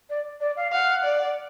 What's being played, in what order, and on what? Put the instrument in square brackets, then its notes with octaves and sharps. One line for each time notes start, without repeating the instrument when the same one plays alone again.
[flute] D5
D5
F5
[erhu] F5 [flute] F#5
[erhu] D5